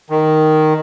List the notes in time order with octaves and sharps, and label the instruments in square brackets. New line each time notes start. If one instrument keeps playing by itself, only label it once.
[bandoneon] D#3